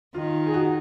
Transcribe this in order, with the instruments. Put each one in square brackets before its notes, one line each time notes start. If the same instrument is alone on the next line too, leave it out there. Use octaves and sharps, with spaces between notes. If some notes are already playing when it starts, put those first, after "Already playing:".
[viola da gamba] D#3 [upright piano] F4
[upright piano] G#4
F#4